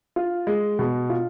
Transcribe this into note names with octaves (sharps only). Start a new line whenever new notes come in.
F4
G#3
B2
F4